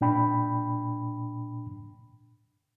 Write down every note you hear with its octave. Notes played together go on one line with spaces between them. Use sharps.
A#2 D4 G5 B5